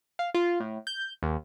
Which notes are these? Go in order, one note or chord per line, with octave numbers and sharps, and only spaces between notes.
F5
F4
A2
G6
D#2